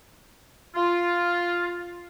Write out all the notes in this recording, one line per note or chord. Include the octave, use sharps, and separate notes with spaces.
F4